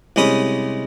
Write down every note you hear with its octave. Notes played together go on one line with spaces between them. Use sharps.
C2 G#3 C#4 B5 D#6